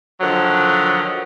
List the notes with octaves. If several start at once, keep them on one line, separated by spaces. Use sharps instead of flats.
D3 D#3 F3 F#3